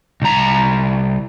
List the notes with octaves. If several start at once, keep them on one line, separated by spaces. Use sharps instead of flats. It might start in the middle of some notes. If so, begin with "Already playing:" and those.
C2 A#5